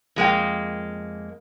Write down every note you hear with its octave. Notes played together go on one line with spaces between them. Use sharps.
F2 G#3 A#3 G5